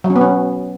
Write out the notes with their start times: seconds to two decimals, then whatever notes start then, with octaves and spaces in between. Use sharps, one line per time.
0.04 F#3
0.10 C#4
0.16 B3
0.21 C#4